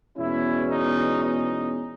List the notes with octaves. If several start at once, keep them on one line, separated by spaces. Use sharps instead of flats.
E2 B2 G#3 C#4 E4
D#4
D#4